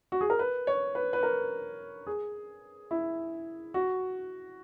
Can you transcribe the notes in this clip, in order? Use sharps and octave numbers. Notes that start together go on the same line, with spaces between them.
F#4
G#4
A#4
B4
C#5
B4
B4
A#4
G#4
E4
F#4